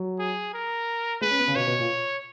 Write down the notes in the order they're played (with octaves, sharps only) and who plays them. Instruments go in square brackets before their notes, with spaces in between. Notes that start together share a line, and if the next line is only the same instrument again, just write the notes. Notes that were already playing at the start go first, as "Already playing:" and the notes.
Already playing: [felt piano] F#3
[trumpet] G#4
A#4
[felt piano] G#3 [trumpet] B4
[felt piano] C#4
B3
C#3
[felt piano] B2 [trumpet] C#5
[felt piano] B2
A#2